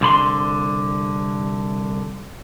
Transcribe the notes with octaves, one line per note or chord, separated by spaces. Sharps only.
C2 D3 B5 C6